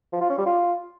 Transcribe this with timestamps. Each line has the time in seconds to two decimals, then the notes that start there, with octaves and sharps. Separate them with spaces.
0.13 F3
0.21 F4
0.29 C#4
0.38 G3
0.46 F4